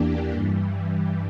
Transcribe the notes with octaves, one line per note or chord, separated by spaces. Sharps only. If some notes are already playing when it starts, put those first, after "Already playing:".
Already playing: E2 E3 A#3 D4 G4
G2 E3 G3